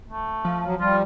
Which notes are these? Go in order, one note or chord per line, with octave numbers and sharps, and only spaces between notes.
A3
F3
F#3
G3 F4